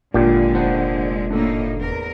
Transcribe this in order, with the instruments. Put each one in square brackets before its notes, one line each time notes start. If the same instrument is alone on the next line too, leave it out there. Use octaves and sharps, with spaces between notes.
[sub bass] G#1 [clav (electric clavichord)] A#2 G4 [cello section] D3 G#3 [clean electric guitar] D4 F4
[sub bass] F1 [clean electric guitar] D4 C5 F#5
[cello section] A2 A#3 D#4 [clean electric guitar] D4 A4
[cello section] E2 A#4